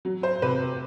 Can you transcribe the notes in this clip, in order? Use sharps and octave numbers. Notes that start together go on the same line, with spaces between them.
F#3
C5
C3 B4